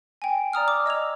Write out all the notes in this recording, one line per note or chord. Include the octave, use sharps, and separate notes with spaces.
G5 G#5
D5 A#5 D#6 F6
D6
D#5 E6 G#6 F7